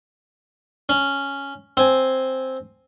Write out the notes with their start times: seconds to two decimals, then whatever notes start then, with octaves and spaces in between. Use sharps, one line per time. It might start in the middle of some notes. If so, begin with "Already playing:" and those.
0.89 C#4
1.77 C4 G#5